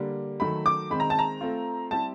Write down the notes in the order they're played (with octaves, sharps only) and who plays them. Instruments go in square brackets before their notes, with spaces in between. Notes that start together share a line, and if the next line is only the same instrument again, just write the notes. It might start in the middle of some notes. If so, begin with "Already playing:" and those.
Already playing: [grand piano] D3 G3 A#3
[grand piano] D#3 F#3 A3 [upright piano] B5
[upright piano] D6
[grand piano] D#3 G#3 C4 [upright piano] B5
[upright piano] A#5
A5
A#5
[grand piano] A3 C4 F4
[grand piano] G3 C4 E4 G4 [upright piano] A5